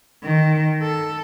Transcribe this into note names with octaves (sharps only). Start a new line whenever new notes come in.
D#3
A4